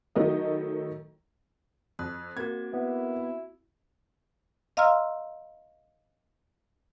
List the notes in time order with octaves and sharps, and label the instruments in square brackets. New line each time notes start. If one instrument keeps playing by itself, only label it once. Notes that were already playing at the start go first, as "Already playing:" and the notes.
[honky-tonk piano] D#3 F#3 A3 E4 C#5 D#5
[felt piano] F2 [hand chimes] D#6 F#6
[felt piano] A#3 G#6 [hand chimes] C4 F#4
[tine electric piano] B3 [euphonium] E4
[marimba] D#5 F5 A#5 C6 E6 F6